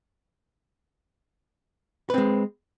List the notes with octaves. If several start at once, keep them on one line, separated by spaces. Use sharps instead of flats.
G#3 C4 B4